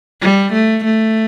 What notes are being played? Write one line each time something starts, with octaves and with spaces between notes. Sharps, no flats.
G3
A3
A3